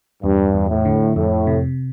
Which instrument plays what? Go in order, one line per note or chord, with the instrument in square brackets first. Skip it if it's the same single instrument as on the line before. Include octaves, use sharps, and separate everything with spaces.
[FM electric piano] E2 [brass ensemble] G2
[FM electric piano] E2
[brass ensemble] A2
[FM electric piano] D3
[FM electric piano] F2 [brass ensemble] A2
[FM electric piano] C3